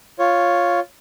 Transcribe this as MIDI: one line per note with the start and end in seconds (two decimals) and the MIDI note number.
0.19 0.80 65
0.19 0.80 73